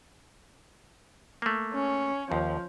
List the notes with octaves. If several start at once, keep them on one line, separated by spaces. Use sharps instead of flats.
A3 A#3
C#4
D#2 F3